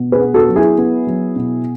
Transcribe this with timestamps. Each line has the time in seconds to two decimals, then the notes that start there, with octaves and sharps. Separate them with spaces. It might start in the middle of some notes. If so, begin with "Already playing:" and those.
Already playing: B2
0.12 G#4 B4
0.20 B3
0.34 F#4 A4
0.49 F#3
0.56 E4 G#4
0.78 B3
1.07 F#3
1.36 B2